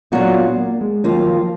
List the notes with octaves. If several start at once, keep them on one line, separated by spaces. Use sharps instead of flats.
A#2 F#3 B3 D4 F4
B3
A#3
G#3
D#2 D#3 F#3 A#3 F4
F3